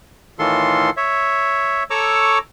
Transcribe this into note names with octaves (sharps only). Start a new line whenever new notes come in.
A2 D#3 E3 F4 A4 C6
C#5 E5
A4 C#5 A#5 C#6 D6 E6